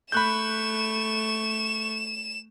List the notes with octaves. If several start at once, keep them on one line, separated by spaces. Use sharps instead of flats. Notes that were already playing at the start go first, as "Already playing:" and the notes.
A3 B5 C#6 F#6 G6 E7